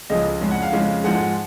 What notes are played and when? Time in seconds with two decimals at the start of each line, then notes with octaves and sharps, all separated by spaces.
0.10 C#2 C#3 F3 G#3 D#5
0.41 F2 C#3 G#3
0.51 F#5
0.62 F5
0.73 F2 C#3 G#3
1.04 G#2 F3 G#3 F#5